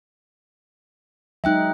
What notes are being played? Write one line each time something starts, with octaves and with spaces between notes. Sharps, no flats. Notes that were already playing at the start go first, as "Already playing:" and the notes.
F#3 G#3 D#4 E5 G5 F#6